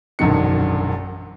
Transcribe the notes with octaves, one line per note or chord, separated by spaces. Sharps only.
E1 A#1 F#2 D3 D#3 C#7